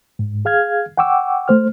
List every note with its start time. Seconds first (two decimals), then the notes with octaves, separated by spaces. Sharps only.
0.19 G#2
0.45 G#4 F5 F6 G#6
0.97 F#5 G5 C#6 D6 E6
1.48 A3 C5 F6